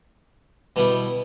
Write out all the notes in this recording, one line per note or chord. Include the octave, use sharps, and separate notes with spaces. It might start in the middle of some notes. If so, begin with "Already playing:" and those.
B2 G3 B3 E4 G4